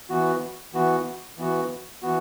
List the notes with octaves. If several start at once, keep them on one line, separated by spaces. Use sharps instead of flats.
E3 B3 F#4
E3 B3 F#4
E3 B3 F#4
E3 B3 F#4